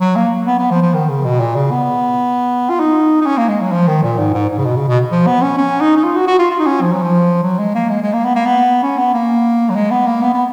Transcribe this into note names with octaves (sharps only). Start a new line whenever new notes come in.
F#3
A#3
B3
B3
F3
F3
D#3
C#3
B2
A#2
C#3
B3
F4
D#4
D#4
C#4
A#3
G#3
F#3
F3
D#3
A#2
G#2
G#2
G#2
C#3
B2
C#3
B2
F3
B3
C#4
C#4
D#4
D#4
F4
F#4
F#4
F4
F4
D#4
C#4
F3
F#3
F3
F#3
G#3
A#3
G#3
G#3
A#3
B3
A#3
B3
C#4
B3
A#3
F#3
G#3
B3
A#3
B3
B3